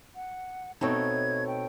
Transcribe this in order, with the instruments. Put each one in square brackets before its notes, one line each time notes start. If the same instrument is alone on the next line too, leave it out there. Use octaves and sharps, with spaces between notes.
[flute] F#5
[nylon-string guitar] B2 C4 D#4 [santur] A3 C#5 [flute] G#6
[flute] G5